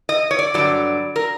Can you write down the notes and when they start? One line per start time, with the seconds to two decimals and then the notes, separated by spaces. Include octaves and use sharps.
0.09 D#5
0.31 C#5
0.39 D5
0.54 G2 D3 F#3 D5
1.16 A#4